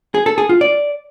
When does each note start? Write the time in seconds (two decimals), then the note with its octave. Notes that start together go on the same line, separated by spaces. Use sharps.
0.14 G#4
0.26 A4
0.38 G#4
0.49 F4
0.61 D5